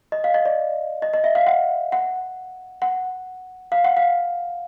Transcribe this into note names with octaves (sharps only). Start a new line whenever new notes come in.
D#5
F5
D#5
D5
D#5
D#5
E5
F5
F#5
F#5
F#5
F5
F#5
F5